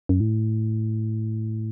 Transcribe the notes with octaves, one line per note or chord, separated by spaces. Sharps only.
F#2
A2